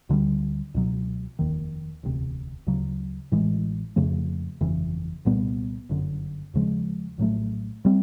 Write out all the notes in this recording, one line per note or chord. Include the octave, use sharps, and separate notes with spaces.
D2 D3 G3
C#2 B2 F#3
F1 D#2 D#3
E1 D2 C3
D2 C#3 F#3
A1 A2 E3 G#3
F2 C#3 F3 A3
G1 F2 C#3 E3
C2 A#2 G3 B3
G1 F#2 D3
D#2 C#3 F3 G#3
A#1 A2 F#3 A3
E3 G3 C4